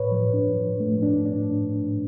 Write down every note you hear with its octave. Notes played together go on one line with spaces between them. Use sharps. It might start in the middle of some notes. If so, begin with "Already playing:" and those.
Already playing: A2 B4 C#5
F3
D4
F3
A3
D4
D4